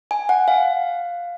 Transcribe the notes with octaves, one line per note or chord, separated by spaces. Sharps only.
G#5
F#5
F5